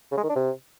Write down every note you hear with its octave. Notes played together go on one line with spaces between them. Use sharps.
C#3
G#3
D#3
D4
C3